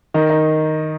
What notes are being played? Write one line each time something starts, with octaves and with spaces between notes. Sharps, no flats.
D#3 D#5
D#4